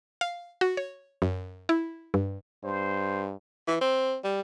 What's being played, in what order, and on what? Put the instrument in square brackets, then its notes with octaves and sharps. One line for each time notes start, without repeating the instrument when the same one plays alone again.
[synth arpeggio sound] F5
F#4
C#5
F#2
E4
G2
[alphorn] G2 [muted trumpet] C5
[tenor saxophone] E3
C4
G3